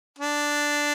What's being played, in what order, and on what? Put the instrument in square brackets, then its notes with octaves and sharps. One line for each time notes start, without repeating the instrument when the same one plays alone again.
[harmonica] D4